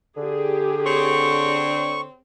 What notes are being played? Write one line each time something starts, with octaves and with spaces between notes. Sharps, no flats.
D3 G4 G#4
C4 C#5 C#6